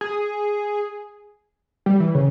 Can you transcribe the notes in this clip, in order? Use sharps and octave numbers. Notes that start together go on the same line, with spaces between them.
G#4
G3
E3
C#3